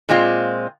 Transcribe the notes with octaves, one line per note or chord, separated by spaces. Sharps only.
A#2 G#3 C4 F4